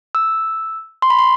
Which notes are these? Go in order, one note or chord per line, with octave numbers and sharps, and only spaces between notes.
E6
C6
B5
C6